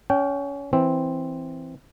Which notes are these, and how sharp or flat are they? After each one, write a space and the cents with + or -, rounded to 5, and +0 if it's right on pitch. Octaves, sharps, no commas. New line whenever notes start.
C#4 +25 G5 -10
E3 +0 C4 +0